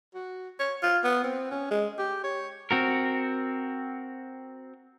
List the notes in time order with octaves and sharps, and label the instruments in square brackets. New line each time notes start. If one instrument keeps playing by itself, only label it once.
[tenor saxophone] F#4
C#5
F4
B3
C4
C#4
G#3
G4
C#5
[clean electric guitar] C4 F#4 A#4